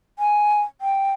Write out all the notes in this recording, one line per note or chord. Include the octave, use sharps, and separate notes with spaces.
G#5
G5